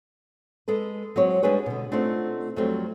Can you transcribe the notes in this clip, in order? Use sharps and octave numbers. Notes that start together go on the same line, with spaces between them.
G#3 A4 B4
F#3 G#3 C4 F#4 C#5
G3 G#3 D4 G#4 B4 C#5
B2 D3
A3 C4 D4 D#4 F4 F#5
F2 F#3 G3 A3 C4